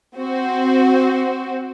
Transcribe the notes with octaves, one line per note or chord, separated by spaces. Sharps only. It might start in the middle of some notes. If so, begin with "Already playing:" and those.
C4 F#4 C5